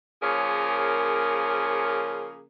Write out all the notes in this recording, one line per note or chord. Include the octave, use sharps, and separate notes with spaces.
C#3 F3 A#3 C#4 G#4 A#4